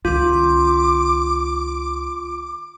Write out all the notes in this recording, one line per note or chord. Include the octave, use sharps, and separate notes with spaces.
C#2 D#3 F4 D6